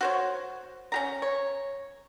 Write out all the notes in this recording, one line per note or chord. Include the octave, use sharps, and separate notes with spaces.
F#4 C5 C#5
C#4 G4 A#5
C#5